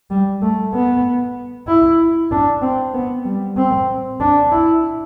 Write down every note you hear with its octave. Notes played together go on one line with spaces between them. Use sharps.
G3
A3
B3
E4
D4
C4
B3
G3
C4
D4
E4